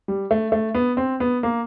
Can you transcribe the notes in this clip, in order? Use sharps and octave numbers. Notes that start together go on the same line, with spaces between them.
G3
A3
A3
B3
C4
B3
A#3